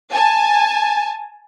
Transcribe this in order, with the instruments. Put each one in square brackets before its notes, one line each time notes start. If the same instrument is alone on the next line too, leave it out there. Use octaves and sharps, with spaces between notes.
[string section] G#5 A5